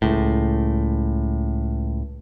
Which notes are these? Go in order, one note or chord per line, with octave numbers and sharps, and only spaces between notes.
C#2 A2